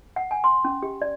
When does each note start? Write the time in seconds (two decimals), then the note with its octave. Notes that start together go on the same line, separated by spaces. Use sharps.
0.16 F#5
0.31 G#5
0.44 C6
0.65 C#4
0.83 G4
1.02 D5